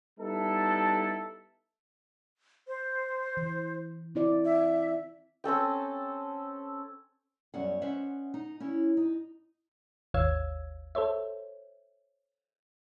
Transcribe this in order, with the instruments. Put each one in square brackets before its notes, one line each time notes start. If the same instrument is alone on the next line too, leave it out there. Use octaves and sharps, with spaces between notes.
[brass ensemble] G3 B3 D#4 E4 A4
[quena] C5
[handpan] E3
C4 E4 D5
[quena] E5
[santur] C4 C#4 A4 G5
[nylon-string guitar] F#2 G3 B3 C#4 F#5
C#4 B4 C5 D#5 E5 F#5
D#4
C#4 E4 C#5
D#4
[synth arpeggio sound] G#1 D#2 C#5 F5 E6 G#6
A4 C5 C#5 E5